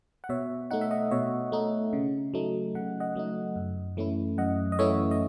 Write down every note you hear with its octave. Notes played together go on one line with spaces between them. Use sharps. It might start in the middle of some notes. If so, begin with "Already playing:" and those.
F#5
B2 C#5 E5
A3 D#4 F#5
E5
D#5 F#5
B2 C#5 E5
A3 D#4
C#3
F#3 A3 D#4
C#3 F#5
D#5 F#5
F#3 A3 D#4
F#2
E3 A3 C#4 E4
F#2 D#5 F#5
D#5
E3 A3 C#4 E4 C#5 E5
D#5